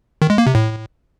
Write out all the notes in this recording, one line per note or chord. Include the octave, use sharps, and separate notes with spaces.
D#3
G#3
A#3
C3
A2